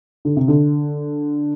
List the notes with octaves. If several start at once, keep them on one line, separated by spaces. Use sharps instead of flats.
D3
C3
D3